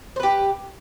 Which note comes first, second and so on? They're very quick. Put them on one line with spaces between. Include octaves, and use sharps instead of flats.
C5 B4 G4